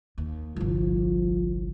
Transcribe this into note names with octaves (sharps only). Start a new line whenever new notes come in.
D#2
G1 C2 F3